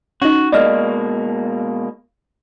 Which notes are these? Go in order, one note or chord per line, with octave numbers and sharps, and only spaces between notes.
C#4 D#4 F#4
B2 G#3 A#3 D5 D#5 F6